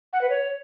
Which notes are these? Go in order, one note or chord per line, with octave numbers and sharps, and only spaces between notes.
F#5
B4
C#5